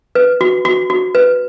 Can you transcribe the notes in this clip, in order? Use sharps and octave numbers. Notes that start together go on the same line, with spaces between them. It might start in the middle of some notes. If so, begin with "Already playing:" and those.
B4
F#4
F#4
F#4
B4